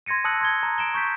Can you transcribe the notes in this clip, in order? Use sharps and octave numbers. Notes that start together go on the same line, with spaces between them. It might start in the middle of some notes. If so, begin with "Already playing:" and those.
C6 G#6 A#6 C#7 D#7
A5 D#6 E6 F#6 C#7 F#7
C6 G#6 G7
A#5
D7 E7 G7
C#6 G6 B6